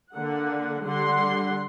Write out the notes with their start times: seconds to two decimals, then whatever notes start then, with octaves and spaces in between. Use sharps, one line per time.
0.13 D3 A#3 F#5
0.85 D3 G3 F#5 C6